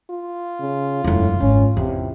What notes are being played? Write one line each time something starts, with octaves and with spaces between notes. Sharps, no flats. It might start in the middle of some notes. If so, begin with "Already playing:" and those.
F4
C#3
E1 F#2 A2
G#1 C#4
E2 C3